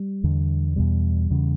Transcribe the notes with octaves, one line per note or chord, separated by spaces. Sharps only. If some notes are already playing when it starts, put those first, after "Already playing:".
Already playing: G3
E2 D3
E2 B2 G3
E2 C#3